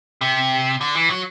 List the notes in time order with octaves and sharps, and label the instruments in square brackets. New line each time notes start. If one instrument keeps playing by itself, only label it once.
[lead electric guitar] C3
D3
E3
F#3